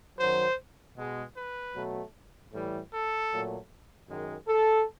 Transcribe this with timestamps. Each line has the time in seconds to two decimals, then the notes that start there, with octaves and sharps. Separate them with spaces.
0.18 F#2 D#3 F#3 C5
0.96 B2 G#3
1.35 B4
1.74 B2 F#3 A3
2.52 A2 E3 G3
2.92 A4
3.31 A#2 F#3 A3
4.09 F#2 D#3 G#3
4.48 A4